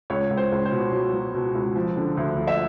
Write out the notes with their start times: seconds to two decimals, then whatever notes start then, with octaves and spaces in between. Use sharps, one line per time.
0.10 C#2 C#5
0.30 C#2
0.37 C5
0.52 C#2
0.65 C5
0.72 B2
0.92 F#3
1.13 F#3
1.34 B2
1.55 C#2
1.75 F3
1.97 D3
2.17 D2
2.38 F3
2.47 E5